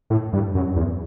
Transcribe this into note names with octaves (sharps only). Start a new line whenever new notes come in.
A2
G2
F#2
E2